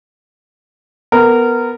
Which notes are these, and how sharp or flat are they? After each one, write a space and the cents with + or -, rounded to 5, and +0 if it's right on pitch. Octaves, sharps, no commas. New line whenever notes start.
B3 +0 A#4 -15